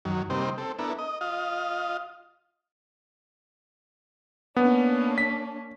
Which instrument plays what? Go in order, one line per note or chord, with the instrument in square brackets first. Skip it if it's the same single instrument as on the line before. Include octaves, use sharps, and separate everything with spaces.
[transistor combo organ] F#2 D#3 F#3
C3 G3 A#3 C4 D#4 C5
C4 A4
B3 D4 E4 A4 A#4
D#5
F4 D#5 F5
[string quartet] A#3 C#4 D4 [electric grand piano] B3
[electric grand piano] B6